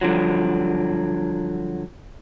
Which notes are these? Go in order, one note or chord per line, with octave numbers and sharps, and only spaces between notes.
G2 D3 F3 F#3